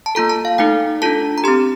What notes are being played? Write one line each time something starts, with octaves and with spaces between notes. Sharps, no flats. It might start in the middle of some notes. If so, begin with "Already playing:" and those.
A5
A#3 F4 A4 A#5
A5
F5
A3 D#4 A4 G5
D4 F4 A4 A5
A#5
C4 G4 C6